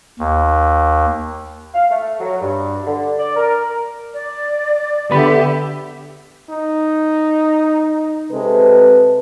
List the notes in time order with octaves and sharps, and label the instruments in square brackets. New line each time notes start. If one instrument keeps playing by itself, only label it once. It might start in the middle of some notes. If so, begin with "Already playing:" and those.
[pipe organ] D#2
[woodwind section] F5
A3
F#3
G2
D3
D5
A#4
[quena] D5
[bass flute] D3 [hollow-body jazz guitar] B3 B5 [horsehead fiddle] G4 E5
[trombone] D#4
[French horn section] C3 A4 B4 [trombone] G#3